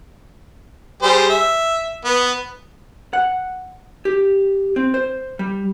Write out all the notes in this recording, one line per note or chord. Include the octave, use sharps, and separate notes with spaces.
G3 G#4 C5
E5
B3
F#5
G4
C4
C5
G3